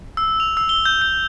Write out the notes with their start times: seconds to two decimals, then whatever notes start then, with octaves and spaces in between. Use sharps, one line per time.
0.17 E6
0.40 F7
0.57 E6
0.69 G7
0.85 G6
1.02 G6